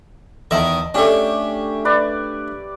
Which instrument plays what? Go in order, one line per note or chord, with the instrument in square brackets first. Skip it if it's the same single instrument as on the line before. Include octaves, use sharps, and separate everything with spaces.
[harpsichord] E2 D#3 E5 [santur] D#5 A5
[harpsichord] A3 D4 [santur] C#4 G4 E5
[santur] B4 D5